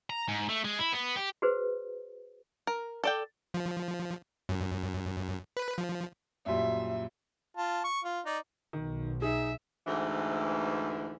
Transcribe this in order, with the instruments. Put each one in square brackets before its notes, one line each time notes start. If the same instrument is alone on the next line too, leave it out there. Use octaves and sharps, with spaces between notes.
[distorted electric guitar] A#5
G#2
A3
G#3
E4
B3
G4
[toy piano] F#4 G#4 B4 C5
[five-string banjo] A#4
A4 D5 G5
[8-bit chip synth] F3
F#2
B4
F3
[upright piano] F#2 A#2 G3 [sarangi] E5
[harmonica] F4 A5
C#6
F4
D#4 D5
[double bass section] B1 [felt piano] D#3
[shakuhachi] D#4 [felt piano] G#4 [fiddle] E5
[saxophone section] D2 G#2 E3